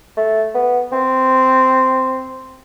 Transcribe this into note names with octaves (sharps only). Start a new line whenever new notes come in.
A3
B3
C4